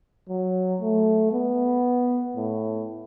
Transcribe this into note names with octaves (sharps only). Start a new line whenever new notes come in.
F#3
A3
B3
A2